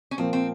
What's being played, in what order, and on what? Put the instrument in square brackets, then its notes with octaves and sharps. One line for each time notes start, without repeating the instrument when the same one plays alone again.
[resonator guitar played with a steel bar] C#4
[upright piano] A#2 F3 A#3 [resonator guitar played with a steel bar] C4
[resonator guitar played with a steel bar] C4